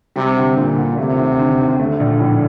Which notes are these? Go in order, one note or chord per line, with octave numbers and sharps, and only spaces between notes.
C3 G3
D2
A#2 D3
D2
C3 A3
D#2
D3
D#2
D3 A3
A#1
A2